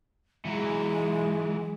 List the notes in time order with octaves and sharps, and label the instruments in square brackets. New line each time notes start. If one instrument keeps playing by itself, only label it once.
[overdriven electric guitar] E3 F#3 [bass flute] G#3